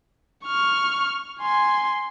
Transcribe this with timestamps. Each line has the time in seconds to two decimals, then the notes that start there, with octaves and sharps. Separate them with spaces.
0.45 C#6 F6
1.41 G#5 C6